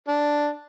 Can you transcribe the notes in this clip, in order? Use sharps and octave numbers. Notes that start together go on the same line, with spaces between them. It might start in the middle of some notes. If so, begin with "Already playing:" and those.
D4